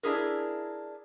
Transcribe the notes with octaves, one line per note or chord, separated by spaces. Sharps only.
D4 E4 G#4 A#4